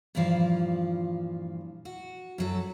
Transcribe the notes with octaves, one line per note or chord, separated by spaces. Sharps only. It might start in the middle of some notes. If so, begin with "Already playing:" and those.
G2 A#2 E3 F3 F5
F#4
F#2 F#3 A4